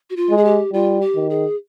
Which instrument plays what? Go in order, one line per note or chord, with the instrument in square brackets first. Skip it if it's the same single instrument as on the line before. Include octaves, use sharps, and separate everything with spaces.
[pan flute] F#4
F4
[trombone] G#3
[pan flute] G#4
G4
[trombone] G3 [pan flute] F4
[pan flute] G4
[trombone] D#3
[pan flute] G#4